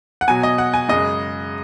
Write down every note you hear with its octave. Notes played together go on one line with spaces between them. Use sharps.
F#5
B2 F#3 G#5
D#5
F#5
G#5
F#2 C#3 G#3 D#5